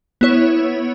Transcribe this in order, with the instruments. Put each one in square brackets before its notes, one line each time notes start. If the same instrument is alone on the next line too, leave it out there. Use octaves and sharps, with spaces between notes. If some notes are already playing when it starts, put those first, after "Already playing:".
[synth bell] B3 E4 C#5